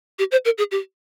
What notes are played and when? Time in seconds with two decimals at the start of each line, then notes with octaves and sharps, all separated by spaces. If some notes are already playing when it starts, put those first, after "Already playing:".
0.19 G4
0.32 C5
0.45 A#4
0.58 G#4
0.71 G4